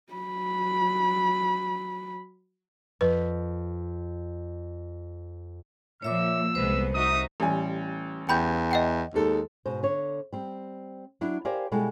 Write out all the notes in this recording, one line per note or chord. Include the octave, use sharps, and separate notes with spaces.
F#3 B5
F2 B4 B6
A#2 F3 C#5 E5 D6 E6
C2 G#3 B3 B4 C5
D#4 F#4 E5 D#6
A1 G3 G#5
E2 G5 B5 G6
D#5 F#5 G5
D#2 G#3 A4
G#2 B2 C5
D3 C#5
G3 C4
F#3 D4 E4
G4 A#4 C5 D5 F5 G#5
B2 G3 G#3 E4 A4